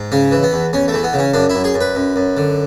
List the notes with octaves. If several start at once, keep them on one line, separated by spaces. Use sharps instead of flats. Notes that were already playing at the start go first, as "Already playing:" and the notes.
Already playing: G#2
C#3 C#4
E3
B3
E2
E2 C#4
A3
E3
B3
C#3
C#4
F#2 D4
E4
F#2
G#4
F#2
B4
F#2
F#2
D3